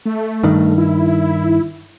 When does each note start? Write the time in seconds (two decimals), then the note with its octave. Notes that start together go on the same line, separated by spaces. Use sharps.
0.06 A3
0.43 G2 D#3
0.78 E4